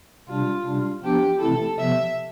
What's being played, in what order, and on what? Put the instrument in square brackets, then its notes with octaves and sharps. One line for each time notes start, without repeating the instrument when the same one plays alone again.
[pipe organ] C3 G3 D4 [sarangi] F4
[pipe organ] C3 G3 D4
[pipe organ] F3 B3 D4 [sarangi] G4
[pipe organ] C3 E3 A3 C4 E4 [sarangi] A4
[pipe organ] C3 F3 B3 [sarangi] E5